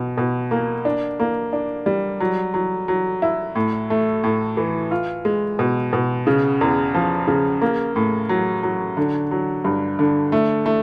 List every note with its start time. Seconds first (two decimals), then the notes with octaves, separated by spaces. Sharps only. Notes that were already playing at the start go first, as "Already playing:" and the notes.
Already playing: B2
0.18 B2
0.51 A#3
0.85 D4
1.20 A#3
1.53 D4
1.86 G3
2.20 F#3
2.54 F#3
2.88 F#3
3.22 E4
3.55 A2
3.90 A3
4.24 A2
4.57 E3
4.91 F4
5.25 G#3
5.59 B2
5.93 B2
6.27 C#3
6.61 E2
6.94 F3
7.27 C#3
7.61 A#3
7.96 A2
8.29 F#3
8.63 F#3
8.97 D3
9.31 F#3
9.64 G2
9.99 D3
10.32 A3
10.66 A3